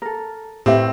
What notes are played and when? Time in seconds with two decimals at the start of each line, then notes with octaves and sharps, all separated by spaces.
0.02 A4 A#4
0.66 A2 C4 G4 B4 E5